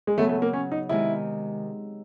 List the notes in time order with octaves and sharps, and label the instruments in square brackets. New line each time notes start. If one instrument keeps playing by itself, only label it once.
[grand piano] G#3
[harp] C#3 F#3 B3 [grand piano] A3
[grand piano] A3
A#3
C#4
D#4
[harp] C3 D#3 G#3 [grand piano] E4